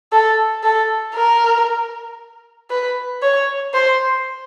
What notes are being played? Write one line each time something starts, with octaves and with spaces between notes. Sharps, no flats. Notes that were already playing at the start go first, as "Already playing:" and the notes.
A4
A4
A#4
B4
C#5
C5